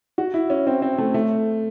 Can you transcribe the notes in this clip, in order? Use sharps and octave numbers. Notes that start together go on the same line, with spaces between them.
F#4
E4
C#4
C4
C4
A3
A3